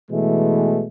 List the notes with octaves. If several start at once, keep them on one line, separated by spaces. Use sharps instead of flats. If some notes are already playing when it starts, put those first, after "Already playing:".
B2 E3 G#3 A3